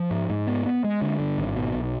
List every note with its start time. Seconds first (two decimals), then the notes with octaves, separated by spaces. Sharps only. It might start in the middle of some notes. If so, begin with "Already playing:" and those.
Already playing: F3
0.11 G#2
0.30 G#2
0.47 B3
0.66 B3
0.84 G#3
1.02 D3
1.20 G2
1.38 G#1
1.56 B2
1.74 B1